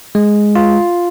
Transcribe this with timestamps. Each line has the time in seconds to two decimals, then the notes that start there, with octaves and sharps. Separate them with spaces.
0.15 G#3
0.56 F4